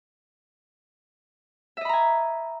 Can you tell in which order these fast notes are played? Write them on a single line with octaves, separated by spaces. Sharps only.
E5 D#5 B5 A#5 G#5